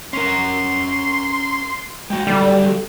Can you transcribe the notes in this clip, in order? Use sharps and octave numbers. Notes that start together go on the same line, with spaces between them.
C#4 A#4 C6
G#3 F#4 G5
D3 F#3 G3 A4